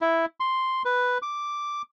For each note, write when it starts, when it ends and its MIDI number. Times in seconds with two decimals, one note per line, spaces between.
0.01 0.25 64
0.40 0.83 84
0.85 1.18 71
1.22 1.82 86